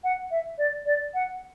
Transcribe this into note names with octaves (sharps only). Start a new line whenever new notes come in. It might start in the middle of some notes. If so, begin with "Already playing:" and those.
F#5
E5
D5
D5
F#5